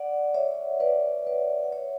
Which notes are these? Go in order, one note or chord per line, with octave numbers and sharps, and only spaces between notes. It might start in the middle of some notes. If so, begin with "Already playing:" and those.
Already playing: D5 F#5
C#5 E5
B4 D5
B4 D5
F#5
C#5 E5